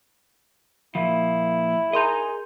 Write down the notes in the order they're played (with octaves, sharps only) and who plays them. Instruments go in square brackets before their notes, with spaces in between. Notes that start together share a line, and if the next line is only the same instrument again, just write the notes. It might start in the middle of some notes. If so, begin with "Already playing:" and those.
[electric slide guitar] A#2 F3 [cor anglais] E4
[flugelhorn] G#4 [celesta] A#4 C6 G6 [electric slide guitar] D#5 A#5